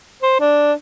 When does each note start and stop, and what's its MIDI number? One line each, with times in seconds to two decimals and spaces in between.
0.22 0.40 72
0.40 0.73 62